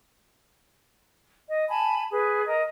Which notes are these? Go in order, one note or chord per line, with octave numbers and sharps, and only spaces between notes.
D#5
G#5 A5 B5
G#4 B4
A#4 D#5 A#5